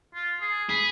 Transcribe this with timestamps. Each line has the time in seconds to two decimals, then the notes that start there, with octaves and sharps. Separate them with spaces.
0.14 F4
0.40 G#4
0.69 G#4 B5